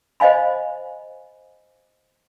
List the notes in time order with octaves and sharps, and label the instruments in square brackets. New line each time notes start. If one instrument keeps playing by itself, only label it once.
[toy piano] C5 D#5 F5 G#5 B5